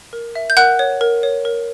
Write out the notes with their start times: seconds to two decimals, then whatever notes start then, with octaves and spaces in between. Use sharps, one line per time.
0.13 A#4
0.35 E5
0.50 G6
0.57 A#4 F#5 F#6
0.79 C#5
1.01 A#4
1.23 C#5
1.45 A#4